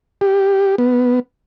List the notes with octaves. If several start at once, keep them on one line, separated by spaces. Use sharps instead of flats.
G4
B3